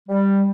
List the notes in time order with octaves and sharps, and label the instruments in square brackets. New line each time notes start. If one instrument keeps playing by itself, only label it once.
[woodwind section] G3